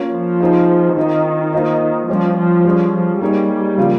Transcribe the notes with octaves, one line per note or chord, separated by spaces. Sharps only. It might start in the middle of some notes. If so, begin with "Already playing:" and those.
Already playing: A#3 C#4 F4
F3
C4 D#4 G#4 C5
D#3 C4 F4 C5 D#5
A#3 F4 C5 D#5
F3 G3 C#4 G4
F3
G3 C#4 G#4 C#5
F3
G3 A#3 D#4 G#4 C#5
C#3 F3 A#3 F4